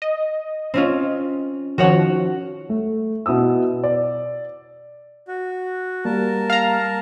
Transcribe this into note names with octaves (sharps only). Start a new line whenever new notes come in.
D#5
C4 C#4 F4
D#3 F3 F#4 C#5 F#5
A3
B2 E4 D#6 E6
D5
F#4
G3 A#3 A#4 A5
F5 A#5